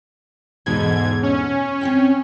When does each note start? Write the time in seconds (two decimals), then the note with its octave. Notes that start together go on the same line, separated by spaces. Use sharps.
0.66 E2 G#2 B2 A4 G#6
1.23 C#4
1.81 C4 C#5 G5